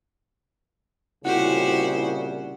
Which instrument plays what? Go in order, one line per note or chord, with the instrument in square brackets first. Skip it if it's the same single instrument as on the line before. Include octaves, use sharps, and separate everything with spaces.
[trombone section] C2 A#2 C#3 [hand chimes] E4 [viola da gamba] F#4 G4 C5 [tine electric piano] F#5